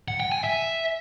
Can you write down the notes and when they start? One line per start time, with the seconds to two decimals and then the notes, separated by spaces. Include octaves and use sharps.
0.08 F#5
0.20 G5
0.32 G#5
0.44 E5